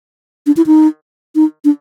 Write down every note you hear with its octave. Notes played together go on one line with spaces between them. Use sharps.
D4
E4
D#4
D#4
D4